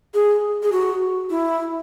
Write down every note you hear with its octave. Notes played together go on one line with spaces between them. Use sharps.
G#4
G#4
F#4
E4